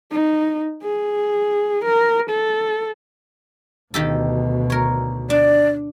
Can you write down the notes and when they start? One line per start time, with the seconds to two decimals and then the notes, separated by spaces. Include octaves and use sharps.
0.12 D#4
0.83 G#4
1.85 A#4
2.30 A4
3.94 D2 B2 D#3 G4 A4
4.70 A#4 C#5
5.30 D4 D5